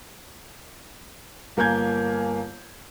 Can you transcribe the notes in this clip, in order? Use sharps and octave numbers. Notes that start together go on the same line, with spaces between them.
G1 A#3 A#4 G#5 G6 G#6